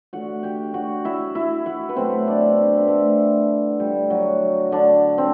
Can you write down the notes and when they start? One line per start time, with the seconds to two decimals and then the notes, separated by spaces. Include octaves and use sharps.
0.13 D3 A3 F#4 F#5
0.43 G4 G5
0.74 F#4 F#5
1.05 E4 E5
1.35 E4 E5
1.66 F#4 F#5
1.89 B4
1.96 B2 F#3 A3 C4 C5
2.27 D4 D5
2.77 B4
2.88 A3 A4
3.80 D3 G3 A3 G4
4.10 F#3 F#4
4.72 D3 D4
5.18 C4